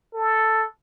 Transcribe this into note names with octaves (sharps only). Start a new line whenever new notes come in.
A4